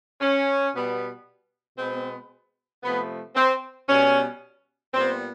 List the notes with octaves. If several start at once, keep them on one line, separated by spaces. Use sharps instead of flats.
C#4
B2 G3 B3
B2 G#3 B3 C4
C3 F3 A3 B3
C4
B2 G3 B3 C#4
A#2 G3 B3 C4